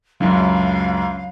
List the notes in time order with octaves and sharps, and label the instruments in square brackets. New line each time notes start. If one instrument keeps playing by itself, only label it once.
[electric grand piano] C#2 F#2 [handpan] F#3 D4 E4 [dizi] F5